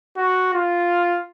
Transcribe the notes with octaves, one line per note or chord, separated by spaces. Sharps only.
F#4
F4